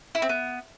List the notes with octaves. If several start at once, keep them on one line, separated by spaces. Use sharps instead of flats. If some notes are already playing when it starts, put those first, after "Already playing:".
E4
C4
B3